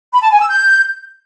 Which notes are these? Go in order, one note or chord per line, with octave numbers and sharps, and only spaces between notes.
B5
A5
G#5
E6
G6